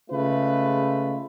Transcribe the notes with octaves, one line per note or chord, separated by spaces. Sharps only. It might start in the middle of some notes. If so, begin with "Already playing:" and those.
C#3 G#3 A3 F4 B4